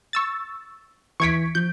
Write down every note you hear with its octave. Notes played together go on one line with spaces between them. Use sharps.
C#6 E6 A6
E3 C#6 G#6 B6 C#7 D7
F3 G6